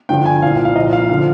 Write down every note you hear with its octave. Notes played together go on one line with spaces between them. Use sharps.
G2 D3 F3 G5
G#5
C2 A#2 F3 F5
F5
C2 A#2 F3 D#5
F5
D3 F3 F5